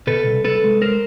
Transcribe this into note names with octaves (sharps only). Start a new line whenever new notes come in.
B2 A4 B4
C2
C2 A4 B4
G#3
A#4 C5